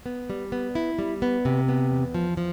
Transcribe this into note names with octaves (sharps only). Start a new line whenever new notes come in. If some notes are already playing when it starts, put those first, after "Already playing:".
B3
G3
B3
E4
G3
B3
C3
B3
E2
F3
F3